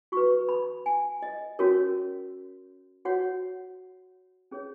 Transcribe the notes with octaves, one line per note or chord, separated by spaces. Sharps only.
F#4 B4 C#6
B5
G#5
D#5
C#4 F#4 A#4 C#5
F#4 C#5 F#5
C#4 G#4 C#5